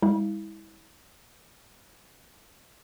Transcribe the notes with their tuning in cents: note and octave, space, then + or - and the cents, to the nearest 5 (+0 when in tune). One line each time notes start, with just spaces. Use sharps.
G#3 -45 E4 -30 F5 -30